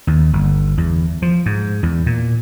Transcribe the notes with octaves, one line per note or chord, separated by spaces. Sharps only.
D#2
G1
E2
F3
G#2
E2
A#2